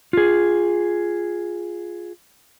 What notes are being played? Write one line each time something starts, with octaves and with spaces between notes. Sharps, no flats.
F4 G#4